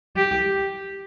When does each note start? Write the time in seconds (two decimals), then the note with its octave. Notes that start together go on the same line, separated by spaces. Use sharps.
0.16 G4